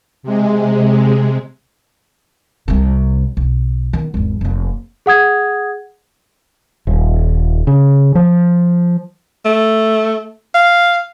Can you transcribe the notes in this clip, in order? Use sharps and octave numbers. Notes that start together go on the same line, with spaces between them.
C3 G#3
C2 C3
B1
D#3 B3
G#1 E2
F1 A#3
G#4 F#5 D#6 G#6
D#1
C#3
F3
A3
F5